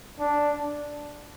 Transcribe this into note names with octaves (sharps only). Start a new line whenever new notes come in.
D4